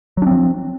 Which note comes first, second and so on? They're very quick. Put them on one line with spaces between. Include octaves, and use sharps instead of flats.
F#3 D4 C4 F3